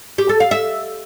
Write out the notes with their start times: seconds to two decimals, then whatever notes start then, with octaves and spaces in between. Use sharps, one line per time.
0.18 G4
0.29 A4
0.40 F5
0.51 E5